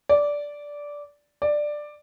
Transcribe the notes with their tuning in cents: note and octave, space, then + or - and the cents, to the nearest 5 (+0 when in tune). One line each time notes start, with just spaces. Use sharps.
D5 -10
D5 +10